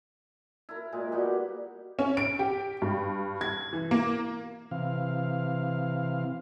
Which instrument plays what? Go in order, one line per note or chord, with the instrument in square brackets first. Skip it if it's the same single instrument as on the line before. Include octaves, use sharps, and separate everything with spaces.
[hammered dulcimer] E4 A#4
A#2 G#3
G3 B3 F#4 G4
[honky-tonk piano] C#4
D7
G4
G2
G#6
E3
A#3
[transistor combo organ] C3 E3 F5